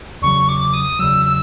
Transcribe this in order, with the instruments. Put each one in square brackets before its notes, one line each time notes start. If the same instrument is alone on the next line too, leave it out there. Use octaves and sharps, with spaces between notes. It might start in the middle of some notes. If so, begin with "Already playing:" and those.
[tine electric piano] E2 C#3 F#3 [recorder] C#6
[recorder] D6
D#6
[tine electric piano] E2 C#3 F#3 [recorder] E6
[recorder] E6